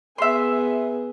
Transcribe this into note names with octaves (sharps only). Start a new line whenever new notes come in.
B3 G#4 E5 C6